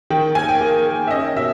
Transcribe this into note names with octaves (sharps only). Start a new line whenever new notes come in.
D#3 G5
A#3 G#5
G5
A#3
A#3
E5
C#4 D#5
B2 E5